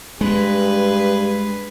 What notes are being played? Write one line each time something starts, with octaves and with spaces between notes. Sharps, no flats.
G2 G#3 G#4 B4